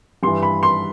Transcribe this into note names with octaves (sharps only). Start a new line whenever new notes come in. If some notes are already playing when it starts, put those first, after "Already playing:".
G2 E3 C6
B5
C6